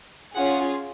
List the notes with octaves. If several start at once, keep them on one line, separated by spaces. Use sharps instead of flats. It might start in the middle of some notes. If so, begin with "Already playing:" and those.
C#4 F4 G#4 F#5